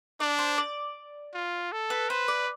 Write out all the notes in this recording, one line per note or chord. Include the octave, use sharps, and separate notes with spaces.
D4 D5
C5
D5
F4
A4
B4
B4 C5
D5